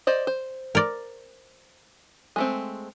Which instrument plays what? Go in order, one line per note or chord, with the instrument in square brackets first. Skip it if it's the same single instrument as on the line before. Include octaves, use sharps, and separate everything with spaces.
[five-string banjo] C5 D5 D#5
C5
[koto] A#4 D5
[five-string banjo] G#3 A3 C4